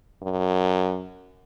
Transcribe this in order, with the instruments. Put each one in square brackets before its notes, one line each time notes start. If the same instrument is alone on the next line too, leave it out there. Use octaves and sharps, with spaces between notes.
[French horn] F#2